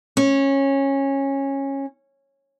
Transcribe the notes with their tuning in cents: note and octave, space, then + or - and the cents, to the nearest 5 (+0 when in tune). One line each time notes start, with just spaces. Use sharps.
C#4 -15